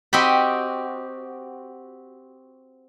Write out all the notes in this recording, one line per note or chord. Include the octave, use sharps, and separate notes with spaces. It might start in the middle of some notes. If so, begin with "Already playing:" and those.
C4 F#4 G4 D#5 G5 B5